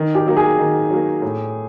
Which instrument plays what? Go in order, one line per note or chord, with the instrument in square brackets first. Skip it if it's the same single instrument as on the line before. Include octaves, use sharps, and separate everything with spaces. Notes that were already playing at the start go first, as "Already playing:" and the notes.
Already playing: [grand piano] D#3
[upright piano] G4
[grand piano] F#3 A#3
[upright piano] G#4
[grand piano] D#3
F#3 A#3
A2